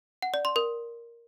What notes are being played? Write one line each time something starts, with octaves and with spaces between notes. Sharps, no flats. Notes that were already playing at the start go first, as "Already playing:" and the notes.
F#5
D5
C6
A#4